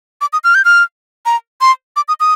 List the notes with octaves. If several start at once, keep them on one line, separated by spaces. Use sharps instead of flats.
D6
D#6
F6
G6
F6
A#5
C6
D6
D#6
D#6